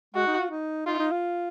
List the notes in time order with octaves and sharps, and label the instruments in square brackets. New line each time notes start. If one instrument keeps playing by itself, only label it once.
[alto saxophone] G#3 [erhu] F#4
[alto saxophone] D#4
F4
D#4
[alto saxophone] D#4 [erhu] F4
[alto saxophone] D#4
F4